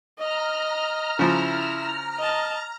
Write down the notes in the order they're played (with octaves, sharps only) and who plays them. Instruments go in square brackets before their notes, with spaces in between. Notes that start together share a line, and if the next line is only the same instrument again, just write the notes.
[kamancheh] D#5 [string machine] A#5 F6
[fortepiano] C#3 F3 [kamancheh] E4 E6
[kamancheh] D#5 A5